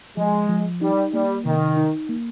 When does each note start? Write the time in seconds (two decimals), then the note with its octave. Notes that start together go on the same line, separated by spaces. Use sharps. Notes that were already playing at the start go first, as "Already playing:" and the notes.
0.17 F3 G#3
0.49 F3
0.81 G3 D#4
1.12 G3 A#3
1.45 C3 D#3
1.77 D#4
2.09 A#3